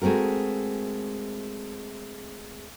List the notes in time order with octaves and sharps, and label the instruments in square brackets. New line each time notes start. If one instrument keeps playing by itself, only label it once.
[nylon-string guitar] G#3 A3 C4 F#4 A#4